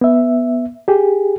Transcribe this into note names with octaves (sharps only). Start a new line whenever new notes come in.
B3 E5
G4 G#4